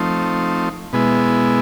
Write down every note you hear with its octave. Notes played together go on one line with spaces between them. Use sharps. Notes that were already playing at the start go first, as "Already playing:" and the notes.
Already playing: F3 A3 C4 D#4
B2 G#3 B3 E4